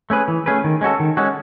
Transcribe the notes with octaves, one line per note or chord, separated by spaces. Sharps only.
A3 C#4 G#4 B4
E3
A3 C#4 G#4 B4
D#3
G#3 C#4 F#4 A4
D#3
G#3 C#4 F#4 A4